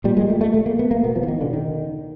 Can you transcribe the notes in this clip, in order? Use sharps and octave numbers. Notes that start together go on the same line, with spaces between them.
A#2 G3
G#3
A3
A3
A3
A#3
B3
A#3
B2 B3
F3
E3
D#3
D3
D#3